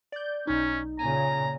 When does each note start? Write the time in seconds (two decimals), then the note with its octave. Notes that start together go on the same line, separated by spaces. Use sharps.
0.12 D5 G6
0.47 B1 C#4 D#4
0.99 A#2 C#3 G#5 A#5